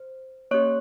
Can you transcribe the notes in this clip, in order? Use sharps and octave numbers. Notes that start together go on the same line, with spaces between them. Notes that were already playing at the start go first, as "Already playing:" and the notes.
Already playing: C5
A#3 C#4 G4 C#5 C#6